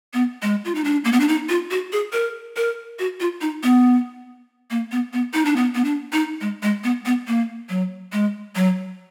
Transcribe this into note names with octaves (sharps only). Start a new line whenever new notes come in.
B3
G#3
F4
D#4
D4
A#3
B3
D4
D#4
F4
F#4
G#4
A#4
A#4
F#4
F4
D#4
B3
A#3
B3
B3
D#4
D4
B3
B3
D4
D#4
G#3
G#3
B3
B3
A#3
F#3
G#3
F#3